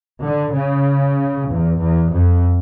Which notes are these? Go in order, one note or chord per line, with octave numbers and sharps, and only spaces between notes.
D3
C#3
E2
E2
F2